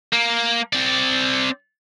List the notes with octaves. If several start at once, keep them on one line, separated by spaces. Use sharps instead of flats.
A#3
C4 D5